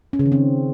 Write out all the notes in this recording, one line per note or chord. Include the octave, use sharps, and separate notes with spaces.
C#4
C#3
D#3
C4